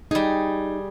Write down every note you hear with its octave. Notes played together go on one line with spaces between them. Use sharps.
G3 D#4 G#4